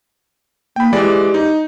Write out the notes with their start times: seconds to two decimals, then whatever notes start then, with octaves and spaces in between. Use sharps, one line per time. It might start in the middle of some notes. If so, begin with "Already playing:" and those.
0.76 A#3 G5 B5
0.93 E3 G#3 G4 D5
1.34 D#4